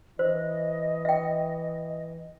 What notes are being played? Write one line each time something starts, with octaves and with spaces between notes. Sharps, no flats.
E3 C5 D#5
E5 G5